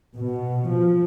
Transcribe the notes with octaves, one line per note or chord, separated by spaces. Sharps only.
B2
F3